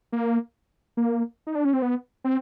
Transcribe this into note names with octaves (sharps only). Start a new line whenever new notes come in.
A#3
A#3
D#4
D4
C#4
C4
B3
C4